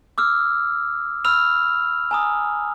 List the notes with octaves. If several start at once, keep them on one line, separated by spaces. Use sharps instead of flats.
D6 E6 F6
B5 E6 F6 F7
G#5 A#5 D#6